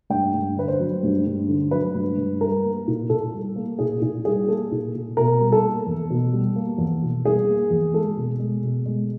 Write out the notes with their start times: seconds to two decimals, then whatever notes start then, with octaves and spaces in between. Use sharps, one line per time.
0.10 G2 G5
0.34 G2
0.56 D3 B4
0.68 C5
0.80 F#3
1.03 G2
1.26 G2
1.48 D3
1.71 F#3 B4
1.94 G2
2.17 G2
2.41 G3 A#4
2.64 A#3
2.88 A#2
3.10 A#2 A4
3.34 G3
3.56 A#3
3.79 A#2 G#4
4.02 A#2 G#4
4.25 G3 G#4
4.48 A#3 A4
4.72 A#2
4.95 A#2
5.17 B2 A#4
5.40 G3
5.52 A4
5.63 A#3
5.86 E2
6.10 B2
6.33 G3
6.56 A#3
6.78 E2
7.02 B2
7.25 G3 G#4
7.48 A#3
7.70 E2
7.94 G#3 A4
8.17 B2
8.40 G#3
8.63 B2
8.86 G#3